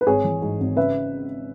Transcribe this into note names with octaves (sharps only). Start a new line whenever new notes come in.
B4
G#1 G#4 C#5
E3
G#2
G#1
C#3 B4 E5